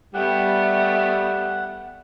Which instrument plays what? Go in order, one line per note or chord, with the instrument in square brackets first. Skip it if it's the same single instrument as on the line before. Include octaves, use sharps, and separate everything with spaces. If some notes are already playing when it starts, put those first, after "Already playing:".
[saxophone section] G3 [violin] A3 B3 [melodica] F#5